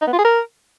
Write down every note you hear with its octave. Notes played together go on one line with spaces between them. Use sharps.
D#4
B3
F4
G#4
A#4